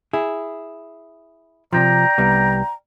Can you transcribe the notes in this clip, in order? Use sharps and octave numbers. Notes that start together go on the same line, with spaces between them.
E4 G#4
C3 D#3 F3 D5 G5 A#5
C2 G3 B3